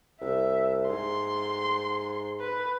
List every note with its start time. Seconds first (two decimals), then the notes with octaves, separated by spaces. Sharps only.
0.21 C2 E5
0.89 G#2 C6
2.40 B4